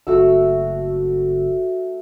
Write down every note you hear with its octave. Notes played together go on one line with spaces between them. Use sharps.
F#1 A3 F#4 E6